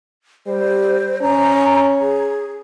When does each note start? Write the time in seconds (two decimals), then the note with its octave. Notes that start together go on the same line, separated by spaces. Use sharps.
0.47 G3 C5
1.22 C#4 A#5
2.00 G#4